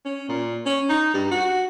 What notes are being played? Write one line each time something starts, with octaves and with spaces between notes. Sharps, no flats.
C#4
A#2
C#4
D#4
G2
F#4